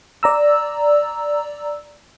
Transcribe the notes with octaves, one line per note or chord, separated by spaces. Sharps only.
D5 A#5 E6